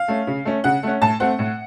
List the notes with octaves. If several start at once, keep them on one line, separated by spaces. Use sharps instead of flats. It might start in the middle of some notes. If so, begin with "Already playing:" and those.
Already playing: F5
A3 C#4
C#3
A3 C#4
C#3 F#5
A3 C#4
A2 A5
A3 C4 F#5
A2